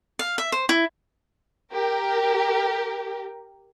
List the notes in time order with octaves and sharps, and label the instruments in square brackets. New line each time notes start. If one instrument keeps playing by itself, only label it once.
[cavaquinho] F5
E5
C5
E4
[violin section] G4 A#4